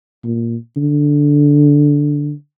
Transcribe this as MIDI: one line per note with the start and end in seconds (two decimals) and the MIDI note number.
0.24 0.56 46
0.76 2.32 50